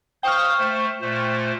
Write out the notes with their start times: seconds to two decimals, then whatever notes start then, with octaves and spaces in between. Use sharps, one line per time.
0.23 C5 F5 G5 C#6 D#6 F6
0.58 A3 C5
1.01 A#2 A3 C5